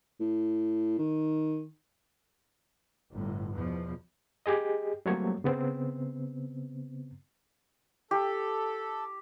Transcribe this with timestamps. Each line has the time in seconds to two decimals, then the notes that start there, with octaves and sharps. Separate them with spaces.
0.20 A2
0.99 D#3
3.13 G1 A2
3.55 E2 B2 F3
4.46 G4 G#4 D#5
5.06 F#3 G3 A3 A#3 C4 C#5
5.44 C#3 B3 C4
8.11 G4 A4